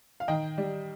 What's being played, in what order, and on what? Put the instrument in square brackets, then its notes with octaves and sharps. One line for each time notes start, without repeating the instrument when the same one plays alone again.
[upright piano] F5
D#3 D#5 G5
G3